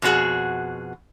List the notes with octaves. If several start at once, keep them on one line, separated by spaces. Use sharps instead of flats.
F2 B2 F#3 F#4 G#4